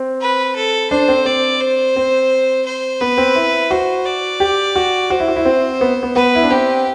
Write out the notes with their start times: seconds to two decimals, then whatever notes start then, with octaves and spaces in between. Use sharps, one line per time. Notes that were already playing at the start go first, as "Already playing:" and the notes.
Already playing: C4
0.21 B4
0.55 A4
0.91 D4 C5
1.08 C4
1.26 C4 D5
1.60 C5
1.96 C4
2.66 C5
3.01 B3 B4
3.18 C4
3.35 E4
3.71 F#4 C5
4.05 D5
4.40 G4
4.76 F#4
5.10 F#4 C5
5.20 E4
5.28 F#4
5.36 E4
5.45 C4
5.81 B3
6.03 B3
6.16 B3 B4
6.35 E4
6.43 D4
6.50 C4 G4